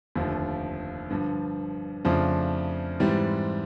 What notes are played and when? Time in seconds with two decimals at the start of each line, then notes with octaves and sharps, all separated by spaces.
0.16 F1 D#2 D3 F3 A3
1.10 G2 D3 F3
2.04 F2 C#3 F3 A3 D4
3.00 G#2 E3 G3 C4